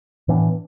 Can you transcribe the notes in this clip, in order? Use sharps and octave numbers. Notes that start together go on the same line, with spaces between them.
A2 E3 B3 D4